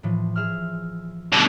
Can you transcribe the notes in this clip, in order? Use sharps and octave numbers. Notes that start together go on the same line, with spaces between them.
A2 E3 F3
G#4 E5 F6
B2 D3 G3 A3